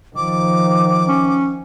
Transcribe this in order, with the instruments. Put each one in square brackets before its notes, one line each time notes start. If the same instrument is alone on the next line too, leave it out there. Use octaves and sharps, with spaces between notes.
[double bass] D#3 F3 [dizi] D6
[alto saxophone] C#4